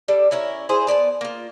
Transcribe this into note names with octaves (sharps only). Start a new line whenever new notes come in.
G3 D4 A4
C#4 E4 A#4 C#5
E4 G#4 C5
B3 D5 G#5 A5
A#3 F4